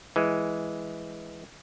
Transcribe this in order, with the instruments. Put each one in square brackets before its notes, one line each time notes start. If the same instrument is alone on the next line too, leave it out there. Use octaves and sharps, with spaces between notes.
[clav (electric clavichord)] E3 G#3